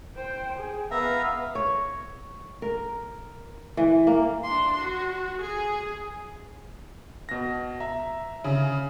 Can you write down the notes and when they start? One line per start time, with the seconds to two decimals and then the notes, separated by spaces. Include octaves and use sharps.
0.16 C5 G5
0.58 G#4
0.91 B3 B4 E5 F5 A#5
1.55 C#5
2.62 A#4
3.77 E3
4.07 A#3
4.43 D4 C6
4.78 F#4
5.40 G#4 G#5
7.29 B2 A#6
7.80 E5 A#5
8.44 C#3